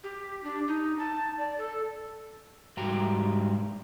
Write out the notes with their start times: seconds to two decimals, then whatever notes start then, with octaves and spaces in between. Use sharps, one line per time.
0.04 G4
0.43 D4
0.68 D#4
0.99 A5
1.38 D5
1.58 A4
2.77 G#2 G3 F#4 G4 A#5